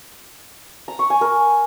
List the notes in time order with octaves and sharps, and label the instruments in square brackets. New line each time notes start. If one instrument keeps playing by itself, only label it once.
[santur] A#5
C#6
G#5
A#4